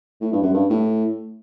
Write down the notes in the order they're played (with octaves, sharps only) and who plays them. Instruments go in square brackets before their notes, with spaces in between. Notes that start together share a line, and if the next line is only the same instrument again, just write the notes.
[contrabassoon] A2
G2
F#2
G2
A2